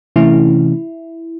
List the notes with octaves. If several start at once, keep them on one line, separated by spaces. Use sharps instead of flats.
C3 E3 A3 C#4 E4